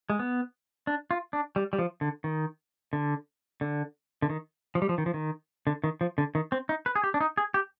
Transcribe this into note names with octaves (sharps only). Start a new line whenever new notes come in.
G#3
B3
D4
F4
D4
G3
G3
F3
D3
D#3
D3
D3
D3
D#3
F3
G3
F3
D#3
F3
D#3
D3
D#3
F3
D3
D#3
C4
D#4
B4
G#4
G4
D4
D#4
G#4
G4